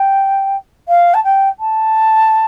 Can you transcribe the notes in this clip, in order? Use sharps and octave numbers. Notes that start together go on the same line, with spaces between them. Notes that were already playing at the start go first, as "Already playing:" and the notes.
Already playing: G5
F5
A5
G5
A5